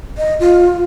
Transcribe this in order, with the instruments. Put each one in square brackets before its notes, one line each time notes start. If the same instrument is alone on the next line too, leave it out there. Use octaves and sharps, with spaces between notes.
[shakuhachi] D#5
F4